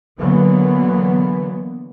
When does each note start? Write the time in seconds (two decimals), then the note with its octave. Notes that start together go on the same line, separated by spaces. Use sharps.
0.17 D3 E3 F#3 A#3 B3